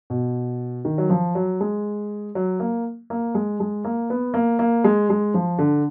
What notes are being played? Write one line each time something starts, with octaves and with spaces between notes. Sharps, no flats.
B2
D#3
F#3
F3
F#3
G#3
F#3
A#3
A#3
G#3
G#3
A#3
B3
A#3
A#3
G#3
G#3
F3
D3